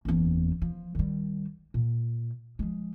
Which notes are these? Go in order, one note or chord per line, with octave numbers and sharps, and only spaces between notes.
F#1 E2
F3
D#3 G3
A#2
F3 G#3